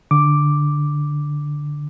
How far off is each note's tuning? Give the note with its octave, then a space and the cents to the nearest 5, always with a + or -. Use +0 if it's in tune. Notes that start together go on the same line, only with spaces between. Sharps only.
D3 +0 D6 +0